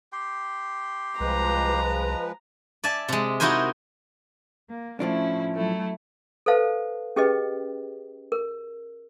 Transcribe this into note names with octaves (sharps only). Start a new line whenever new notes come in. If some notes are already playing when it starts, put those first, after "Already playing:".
G4 G5 C6
C2 F3 G#3 B4 A#5
D5 E5 G#5 A5
C3 G#3
D#4 E4 F#4 A#4 C5 G#5
A#3
A2 F3 C#4 D4 E4
F#3 A3 E4
A4 B4 C5 F5 A5
C#4 G4 G#4 B4 D#5 G5
A#4